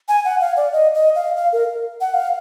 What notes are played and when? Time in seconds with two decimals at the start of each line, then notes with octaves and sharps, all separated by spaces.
0.08 G#5
0.25 F#5
0.41 F5
0.57 D5
0.73 D#5
0.94 D#5
1.15 F5
1.37 F5
1.53 A#4
2.01 F#5
2.14 F5